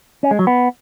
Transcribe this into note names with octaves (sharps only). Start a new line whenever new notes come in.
C#4
G#3
F#3
B3